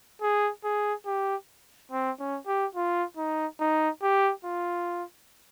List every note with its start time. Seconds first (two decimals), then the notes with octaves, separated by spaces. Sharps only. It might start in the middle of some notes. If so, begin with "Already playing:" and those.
0.22 G#4
0.64 G#4
1.06 G4
1.91 C4
2.19 C#4
2.47 G4
2.75 F4
3.17 D#4
3.60 D#4
4.02 G4
4.45 F4